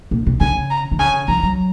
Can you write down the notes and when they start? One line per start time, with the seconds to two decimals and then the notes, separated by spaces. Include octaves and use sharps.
0.11 A#2
0.27 B2
0.40 C#3 G#5
0.70 A#5
0.91 D#3
0.99 C#3 G#5
1.28 F3 A#5
1.43 F#3